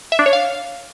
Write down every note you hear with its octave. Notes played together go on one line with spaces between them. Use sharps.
E5
D4
C#5
F5